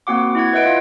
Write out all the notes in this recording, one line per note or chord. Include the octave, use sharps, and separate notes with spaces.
A#3 C4 F#4 F#5 D6
E4 F#5 G#6
B4 D#5 E5 F#5 D7
F4 E5 F5